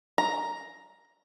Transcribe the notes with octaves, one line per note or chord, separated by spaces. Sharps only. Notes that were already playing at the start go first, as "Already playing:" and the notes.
A#5